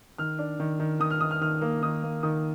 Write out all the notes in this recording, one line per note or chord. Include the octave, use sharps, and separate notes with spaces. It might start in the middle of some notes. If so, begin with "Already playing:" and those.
D#3 F6
D4
D#3
D#3
D#3 D#6
F6
D#3 D#6
F6
D#3 F6
A#3
D#3 D#6
A#3
D#3 D#6